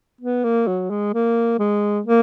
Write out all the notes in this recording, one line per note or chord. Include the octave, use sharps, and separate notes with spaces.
B3
A#3
F#3
G#3
A#3
G#3
A#3